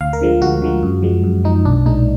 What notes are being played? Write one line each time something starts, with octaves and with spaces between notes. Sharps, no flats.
D2 F5
A#4
D3 F3 G#3
D2 F#4
D3 F3 G#3
F#2
F3 G#3
F#2
F3 G#3 D#4
B1 D4
A#2 G#3 D#4